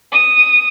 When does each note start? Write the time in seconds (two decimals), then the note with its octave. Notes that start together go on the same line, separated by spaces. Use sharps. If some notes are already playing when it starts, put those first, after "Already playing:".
0.12 D#6